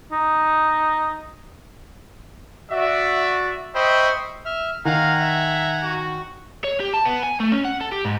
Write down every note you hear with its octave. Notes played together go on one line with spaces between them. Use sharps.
D#4
F#4 D5 E5
C5 D#5 E5 G5 B5 C#6
E5 F6
D#3 F5 F#5 G#5 A#5
E5
F#4
C#5
G4
A5
B3
G#5
A3
C#4
F#5
A4
G4
G#2